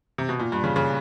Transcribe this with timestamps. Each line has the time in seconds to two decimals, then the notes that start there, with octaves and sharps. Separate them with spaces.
0.18 C3
0.29 B2
0.40 A#2
0.52 G2
0.64 C#3
0.76 C#3